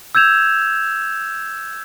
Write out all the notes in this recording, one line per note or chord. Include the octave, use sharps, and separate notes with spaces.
E6 G6 G#6 E7 F7